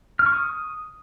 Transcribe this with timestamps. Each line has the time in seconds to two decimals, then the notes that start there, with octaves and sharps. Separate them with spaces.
0.19 F6
0.26 C#6
0.33 D#6